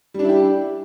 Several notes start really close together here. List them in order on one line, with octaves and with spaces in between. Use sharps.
G3 D4 E4 G4